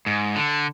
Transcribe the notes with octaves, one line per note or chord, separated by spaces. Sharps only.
G#2
D3